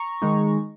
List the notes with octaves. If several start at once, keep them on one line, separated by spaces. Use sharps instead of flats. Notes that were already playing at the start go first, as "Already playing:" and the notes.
Already playing: A#5 C#6
D#3 G#3 D#4